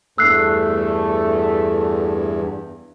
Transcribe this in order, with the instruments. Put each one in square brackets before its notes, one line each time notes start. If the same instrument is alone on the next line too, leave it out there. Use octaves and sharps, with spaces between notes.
[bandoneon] E2 G2 [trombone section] A3 [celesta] E6 F#6 C7